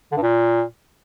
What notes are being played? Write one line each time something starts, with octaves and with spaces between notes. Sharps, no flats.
D3
G2
A#2